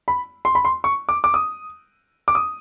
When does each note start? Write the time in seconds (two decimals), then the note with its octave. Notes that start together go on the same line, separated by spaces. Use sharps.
0.08 B5
0.45 C6
0.55 B5
0.65 C6
0.84 C#6
1.09 D6
1.24 D6
1.34 D#6
2.28 D6
2.35 D#6